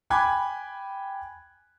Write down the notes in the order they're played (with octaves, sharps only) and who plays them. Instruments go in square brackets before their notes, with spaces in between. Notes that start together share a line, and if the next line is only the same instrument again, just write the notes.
[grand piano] G5 G#5 B5 D6 F#6 G#6